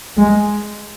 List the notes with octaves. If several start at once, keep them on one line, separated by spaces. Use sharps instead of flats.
G#3